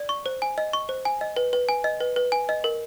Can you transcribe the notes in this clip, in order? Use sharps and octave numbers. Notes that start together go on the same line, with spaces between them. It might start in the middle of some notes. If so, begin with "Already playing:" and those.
Already playing: D5
C#6
C5
G#5
D#5
C#6
C5
G#5
D#5
B4
B4
G#5
D#5
B4
B4
G#5
D#5
A#4